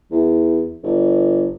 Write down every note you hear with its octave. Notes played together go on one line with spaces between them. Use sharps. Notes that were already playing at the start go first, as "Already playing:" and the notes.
E2
G1